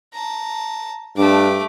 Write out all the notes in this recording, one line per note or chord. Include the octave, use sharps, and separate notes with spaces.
A5 A#5
G2 A3 D4 D6